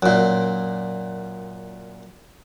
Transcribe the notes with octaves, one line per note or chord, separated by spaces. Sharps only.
F#2 A#2